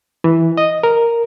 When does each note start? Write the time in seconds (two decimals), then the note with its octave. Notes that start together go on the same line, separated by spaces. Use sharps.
0.24 E3
0.57 D#5
0.83 A#4